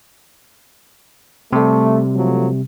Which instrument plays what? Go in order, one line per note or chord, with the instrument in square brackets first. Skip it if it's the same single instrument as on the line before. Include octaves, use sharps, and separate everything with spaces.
[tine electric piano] C3 G3 [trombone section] A3
[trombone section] F3 F#3 A3